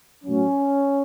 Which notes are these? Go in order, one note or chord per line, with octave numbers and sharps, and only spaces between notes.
A2 F#3 C#4